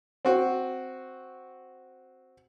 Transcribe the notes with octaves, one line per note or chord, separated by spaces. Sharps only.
C4 F#4